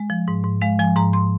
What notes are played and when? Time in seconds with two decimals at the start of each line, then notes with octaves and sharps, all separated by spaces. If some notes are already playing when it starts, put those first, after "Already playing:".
Already playing: G#3
0.10 F3
0.28 G#2
0.44 G#2
0.62 G#3 F5
0.79 F3 G#5
0.96 G#2 A#5
1.13 C6